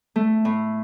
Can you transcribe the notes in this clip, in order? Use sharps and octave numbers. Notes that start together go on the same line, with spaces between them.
A3
A2